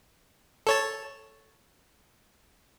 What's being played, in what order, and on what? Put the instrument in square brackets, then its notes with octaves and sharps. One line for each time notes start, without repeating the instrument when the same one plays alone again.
[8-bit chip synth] A4 C#5 A5